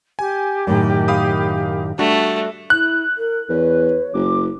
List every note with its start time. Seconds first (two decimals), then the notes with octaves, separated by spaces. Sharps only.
0.19 G4 G#5
0.67 F#2 A2 D#3
1.08 F5 B5 D#6
1.99 G3 A3 D4 F#4
2.70 E4 F#6
3.18 A#4
3.49 E2 B4 C#5
4.14 F#1 D6